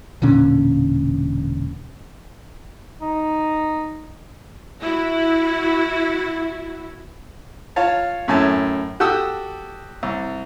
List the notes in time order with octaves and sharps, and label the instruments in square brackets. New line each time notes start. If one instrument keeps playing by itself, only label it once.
[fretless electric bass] E1 A#2 D3 C#4
[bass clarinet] D#4
[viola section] E4 F#4
[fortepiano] F4 C#5 F5 A5
F#2 A2 G#5 A5
F#4 G4 A4 D#6 E6
C2